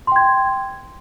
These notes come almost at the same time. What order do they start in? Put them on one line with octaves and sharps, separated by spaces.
C6 G5 G#6